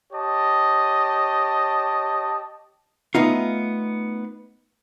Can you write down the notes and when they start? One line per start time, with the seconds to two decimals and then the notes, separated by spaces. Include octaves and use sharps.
0.13 G4 C#5 D#5 A5
3.15 A3 B3 D#4 F4